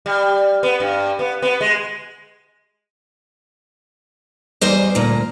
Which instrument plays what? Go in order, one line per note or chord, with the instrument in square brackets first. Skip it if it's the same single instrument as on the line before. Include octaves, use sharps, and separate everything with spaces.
[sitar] G3
B3
G2
B3
B3
G#3
[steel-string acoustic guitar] E2 G3 C5 D#5
D2 A#2